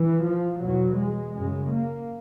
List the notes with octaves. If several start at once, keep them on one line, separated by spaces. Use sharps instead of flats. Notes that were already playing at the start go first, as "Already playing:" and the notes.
Already playing: E3
F3
E2 B2 F#3
G#3
F#2 C#3 G#3
A#3